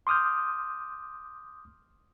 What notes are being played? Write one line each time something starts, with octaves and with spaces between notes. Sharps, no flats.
C6 D6 D#6 F6 G6